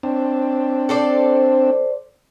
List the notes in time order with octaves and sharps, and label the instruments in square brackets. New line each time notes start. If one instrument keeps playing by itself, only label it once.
[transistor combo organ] C4 D4
[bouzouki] A4 C5 D5